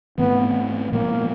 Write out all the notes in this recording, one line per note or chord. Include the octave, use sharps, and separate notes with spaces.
G#2 E3 A3 B3 C4
A#2 F3 G#3 A#3 B3